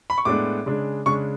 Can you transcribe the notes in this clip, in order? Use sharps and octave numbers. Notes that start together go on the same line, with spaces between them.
B5
C#6
A2 G#3 B3 D4 D6
C#3 G#3 D4
C#3 G#3 D4 C#6